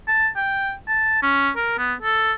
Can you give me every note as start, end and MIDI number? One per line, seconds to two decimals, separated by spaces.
0.08 0.28 81
0.36 0.73 79
0.88 1.20 81
1.23 1.50 61
1.56 1.76 70
1.78 1.94 59
2.02 2.33 69